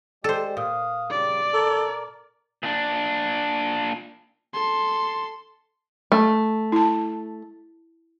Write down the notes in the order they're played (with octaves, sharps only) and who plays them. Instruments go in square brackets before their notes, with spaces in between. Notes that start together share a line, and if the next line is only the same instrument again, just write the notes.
[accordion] G#3 G4 D5 [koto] A4 C5
[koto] A#2 [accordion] F5 D#6
[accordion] C#3 G3 [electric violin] D5
[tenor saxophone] A4 [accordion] A#4
[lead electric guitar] A#2 D4
[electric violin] A4 C6
[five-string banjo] A3
[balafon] E4 A5